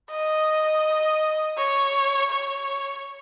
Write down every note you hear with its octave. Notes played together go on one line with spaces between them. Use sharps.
D#5
C#5
C#5